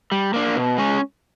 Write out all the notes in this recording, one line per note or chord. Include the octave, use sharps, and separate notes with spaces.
G3
A#3 D4
B2
G#3 C#4